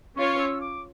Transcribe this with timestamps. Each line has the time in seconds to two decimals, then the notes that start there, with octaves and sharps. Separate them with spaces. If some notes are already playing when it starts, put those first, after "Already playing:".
0.16 C#4 F4 C#5 C#6
0.39 E6
0.61 D6